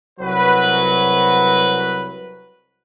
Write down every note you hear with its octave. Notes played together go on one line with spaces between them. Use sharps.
C2 F#3 F#4 B4